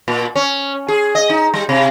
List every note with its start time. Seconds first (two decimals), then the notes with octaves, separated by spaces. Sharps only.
0.08 A#2
0.36 C#4
0.88 G#4
1.15 D#5
1.30 D#4
1.54 G3
1.69 C3